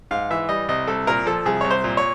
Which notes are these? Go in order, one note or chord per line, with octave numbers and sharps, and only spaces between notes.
G#2 F5
E3 E5
G3 D#5
C2 D#5
C2 A4
A#2 A#4
F3 A4
C2 G#4
C2 C#5
C5
A#2
C#5